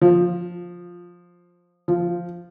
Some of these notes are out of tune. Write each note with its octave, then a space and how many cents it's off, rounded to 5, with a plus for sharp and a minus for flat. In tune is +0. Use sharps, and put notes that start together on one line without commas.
F3 +10
F3 -5